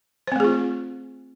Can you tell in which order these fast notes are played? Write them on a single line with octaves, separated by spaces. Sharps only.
C5 C4 A3 G#4 F4